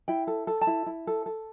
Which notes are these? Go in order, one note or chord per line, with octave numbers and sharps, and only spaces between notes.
E4 G5
A4
A4
A5
E4
E4
A4
A4